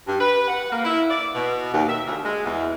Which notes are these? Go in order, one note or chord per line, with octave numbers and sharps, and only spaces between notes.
G2
B4
F#5
A#3
E4
D5
B2
D#2
E5
D2
G#3
E2